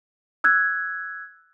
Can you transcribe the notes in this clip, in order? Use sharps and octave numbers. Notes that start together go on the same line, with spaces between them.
E6 F#6 G#6